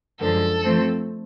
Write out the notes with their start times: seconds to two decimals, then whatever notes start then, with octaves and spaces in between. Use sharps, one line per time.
0.20 F#2 D3 F3 G#3 A4
0.63 F3 A3 C4